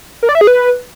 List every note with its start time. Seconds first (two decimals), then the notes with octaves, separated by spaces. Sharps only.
0.23 A#4
0.29 D5
0.35 E5
0.41 G#4
0.47 B4